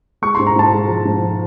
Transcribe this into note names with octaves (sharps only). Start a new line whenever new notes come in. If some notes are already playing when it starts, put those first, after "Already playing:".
G#3 C#6
G#2 C6
A#5
G#2 A5
G#3
F3
G#2
F3